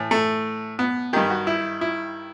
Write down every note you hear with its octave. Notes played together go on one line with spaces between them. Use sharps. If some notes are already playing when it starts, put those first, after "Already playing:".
Already playing: A2 E3
A3
B3
G2 D#3 G4
F#4
E4
E4